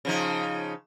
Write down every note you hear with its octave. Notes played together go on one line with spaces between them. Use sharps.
C#3 F3 D#4